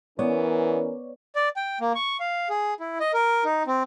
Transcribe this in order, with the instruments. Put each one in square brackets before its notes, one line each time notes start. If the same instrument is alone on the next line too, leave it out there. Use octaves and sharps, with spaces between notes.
[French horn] E3 [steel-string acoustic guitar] B3 [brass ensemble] C#4 A#4 [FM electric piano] C#5 D5
[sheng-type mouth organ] D5
G5
A#3
C#6
F5
G#4
E4
D#5
A#4
D#4
C4